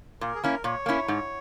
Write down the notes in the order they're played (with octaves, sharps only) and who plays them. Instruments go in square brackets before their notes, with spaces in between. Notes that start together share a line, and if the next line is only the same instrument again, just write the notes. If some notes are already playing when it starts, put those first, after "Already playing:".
[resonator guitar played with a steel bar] A#2 [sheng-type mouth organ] A#4
[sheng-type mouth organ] G#4
[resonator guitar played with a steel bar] A#3 C#4 E4 [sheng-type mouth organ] A#4
[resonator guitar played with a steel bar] A#2 [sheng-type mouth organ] C#5
[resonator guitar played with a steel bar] A#3 C#4 E4
G#2